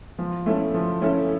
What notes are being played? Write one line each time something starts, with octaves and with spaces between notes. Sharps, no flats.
F3
A3 C#4 E4 A4
F3
A3 C#4 E4 A4